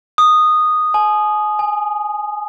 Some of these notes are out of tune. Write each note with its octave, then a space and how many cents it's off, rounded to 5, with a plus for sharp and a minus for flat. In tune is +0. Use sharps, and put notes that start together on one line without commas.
D#6 -10
G#5 +35
G#5 -10